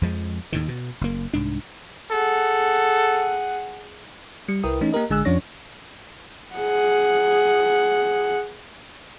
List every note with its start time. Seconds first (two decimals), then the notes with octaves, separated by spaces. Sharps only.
0.01 F2 F3 G#3
0.52 D#2 A2 D#3
0.68 B2
1.01 F#1 A#3
1.33 C2 G#2 D4
2.11 G#4 A4 F#5
4.48 G3 C#7
4.63 C2 E4 A#4 B4 G5 D#6
4.81 E3 A3 C#4 D#4
4.93 A#3 G4 A#4 D#5
5.10 A1 D3 G#3 G#5 E6 F#6
5.25 F2 F3 C#4 D4 C#5 A#6
6.55 G#4 F#5